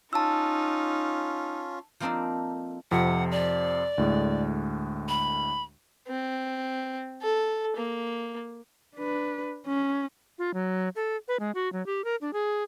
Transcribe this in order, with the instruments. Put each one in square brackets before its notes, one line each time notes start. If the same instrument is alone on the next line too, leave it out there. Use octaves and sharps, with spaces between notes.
[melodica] C#4 F4 [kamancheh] D#4 [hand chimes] A5 E6
[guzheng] F3 A#3 C4 D4 D#4 A4
[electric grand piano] F2 C3 F3 [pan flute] F#5
[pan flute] D5
[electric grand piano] D2 A2 G#3
[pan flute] B5
[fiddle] C4
A4
A#3
[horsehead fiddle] D4 B4
C#4
[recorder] F4
F#3
A4
B4
G#3
F#4
F#3
G4
A#4
D4
G#4